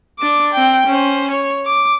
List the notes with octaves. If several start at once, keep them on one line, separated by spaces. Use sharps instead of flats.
D4 D6
C4 G5
C#4 C5
C#5
D6